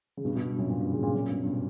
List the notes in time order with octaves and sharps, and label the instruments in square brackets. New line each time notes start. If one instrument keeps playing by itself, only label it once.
[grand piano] C#3
G2 B2
G2 B2
G2
F#2 A#2
F#2 A#2
G2 B2
A#2 C#3
A#2 C#3
F#2 A#2
G2 B2
G2 B2